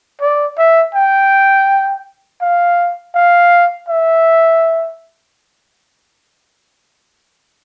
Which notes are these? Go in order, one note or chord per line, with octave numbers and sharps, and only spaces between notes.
D5
E5
G5
F5
F5
E5